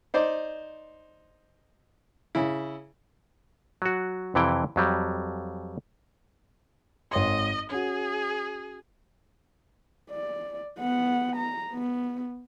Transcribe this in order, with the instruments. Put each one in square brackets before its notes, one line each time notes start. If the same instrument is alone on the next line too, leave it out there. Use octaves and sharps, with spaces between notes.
[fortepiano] D#4 C5 D5
C#3 E4
[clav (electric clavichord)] F#3 F#4
F2 C3 E3 E4 G5
F2 F#3 G3
[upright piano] G#1 C#5 C6 [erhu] D#5
[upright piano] C#4 F#4 [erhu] G#4
[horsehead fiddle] D5
B3 F#5
A#5
B3